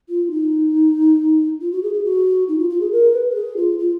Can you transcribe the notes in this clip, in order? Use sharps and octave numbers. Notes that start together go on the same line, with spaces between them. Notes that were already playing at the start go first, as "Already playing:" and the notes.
F4
D#4
F4
F#4
G#4
G#4
F#4
D#4
F4
F4
G#4
A#4
B4
A#4
G#4
F4
F4